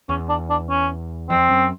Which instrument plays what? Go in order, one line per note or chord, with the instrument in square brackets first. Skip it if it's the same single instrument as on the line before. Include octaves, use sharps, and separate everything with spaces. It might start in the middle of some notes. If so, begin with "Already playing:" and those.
[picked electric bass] E2 [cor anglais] C#4
[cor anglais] D4
D4
C#4
[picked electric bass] F2 [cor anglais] C4
[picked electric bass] F#2